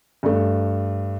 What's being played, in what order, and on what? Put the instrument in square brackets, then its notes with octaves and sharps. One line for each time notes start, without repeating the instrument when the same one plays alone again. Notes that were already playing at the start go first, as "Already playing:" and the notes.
[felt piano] G2 A3